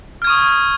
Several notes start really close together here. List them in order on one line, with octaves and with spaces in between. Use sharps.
F6 G#6 C#6 D#6